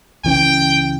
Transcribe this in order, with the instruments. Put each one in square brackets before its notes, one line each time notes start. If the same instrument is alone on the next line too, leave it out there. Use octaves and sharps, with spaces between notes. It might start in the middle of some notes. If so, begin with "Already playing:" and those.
[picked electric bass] C#2 E3 C#4 [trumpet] G5